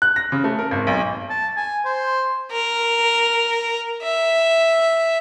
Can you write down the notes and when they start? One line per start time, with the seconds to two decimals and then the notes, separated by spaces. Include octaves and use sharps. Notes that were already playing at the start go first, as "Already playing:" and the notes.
0.02 F#6
0.16 A#6
0.32 C#3
0.44 A3
0.59 A#4
0.71 G#1
0.87 B1
1.30 A5
1.56 G#5
1.85 C5
2.52 A#4
4.03 E5